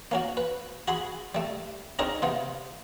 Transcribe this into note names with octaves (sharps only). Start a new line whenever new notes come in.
A#3 C#4 F#4
B4
F#4 G#4 B5 C6
G3 A3
C4 D4 D#4 G#4 A#4 C#5
C3 B3 F4